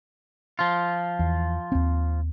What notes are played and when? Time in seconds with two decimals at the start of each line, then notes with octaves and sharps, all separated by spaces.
0.59 F3 F4
1.19 E2
1.72 D#2 C4